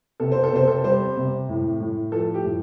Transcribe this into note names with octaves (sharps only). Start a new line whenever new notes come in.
C3 A4
C5
A4
C3 C5
A4
G3 C5
C3
A2
A2
F3 A4
G4
A2